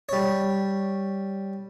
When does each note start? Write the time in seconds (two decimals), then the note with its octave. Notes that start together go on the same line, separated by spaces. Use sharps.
0.09 G3 C#5